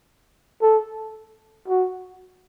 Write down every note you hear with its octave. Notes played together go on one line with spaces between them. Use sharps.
A4
F#4